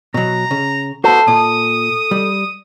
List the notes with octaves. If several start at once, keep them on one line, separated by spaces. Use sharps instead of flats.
B2 F#3 A#5
C#3
B3 F#4 A4 C5
A#2 D#6
G3